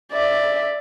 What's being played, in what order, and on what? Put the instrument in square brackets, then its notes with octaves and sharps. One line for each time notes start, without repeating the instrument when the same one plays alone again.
[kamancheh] D5 E5